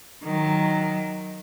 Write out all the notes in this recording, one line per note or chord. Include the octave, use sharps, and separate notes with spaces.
D#3 F#3